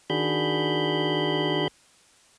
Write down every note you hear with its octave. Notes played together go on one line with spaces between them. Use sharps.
D#3 D4 F#4 G#4 B5 G6